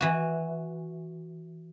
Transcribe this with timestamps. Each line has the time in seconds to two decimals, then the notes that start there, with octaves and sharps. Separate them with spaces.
0.01 E3 F#4